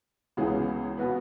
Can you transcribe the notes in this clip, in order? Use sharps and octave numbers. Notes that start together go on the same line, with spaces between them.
C#2 C#3 E3 B3 G#4
B2 B3 F#4 B4